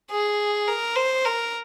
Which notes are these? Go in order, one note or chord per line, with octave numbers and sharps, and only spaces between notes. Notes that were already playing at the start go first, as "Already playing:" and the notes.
G#4
A#4
C5
A#4